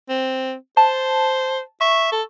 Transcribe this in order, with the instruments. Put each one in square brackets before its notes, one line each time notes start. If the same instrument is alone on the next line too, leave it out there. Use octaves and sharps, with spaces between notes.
[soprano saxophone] C4
[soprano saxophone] C5 [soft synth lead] A5
[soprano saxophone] E5 [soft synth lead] C#6
[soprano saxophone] A4